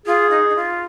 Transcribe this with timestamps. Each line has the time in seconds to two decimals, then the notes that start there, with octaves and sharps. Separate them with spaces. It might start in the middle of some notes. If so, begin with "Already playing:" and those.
0.06 F4 G#4
0.30 D#4
0.49 D#4
0.56 F4